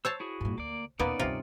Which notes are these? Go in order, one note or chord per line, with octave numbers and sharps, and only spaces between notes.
C5 C#5 A5 E6
E4 F#4 G#4
G2 A#2
D2 A#3 D5
E2 B2 A#3 B3 C#4 D#4 D5
D2 G2 C3 F4